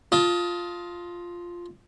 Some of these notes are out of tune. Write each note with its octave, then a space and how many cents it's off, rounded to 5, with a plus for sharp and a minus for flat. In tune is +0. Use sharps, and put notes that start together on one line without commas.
F4 +0 D#5 +20 A5 +0